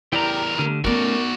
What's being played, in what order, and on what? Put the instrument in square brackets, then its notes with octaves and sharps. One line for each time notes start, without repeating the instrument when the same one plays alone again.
[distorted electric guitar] E2 A#4 [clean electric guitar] E4 D5 A#5 [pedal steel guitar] G4 G5
[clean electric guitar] D3 [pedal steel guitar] A3 G4 F6
[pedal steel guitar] A3 C#4 [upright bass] B3 D#4 [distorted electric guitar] F#4 D5 [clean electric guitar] A#4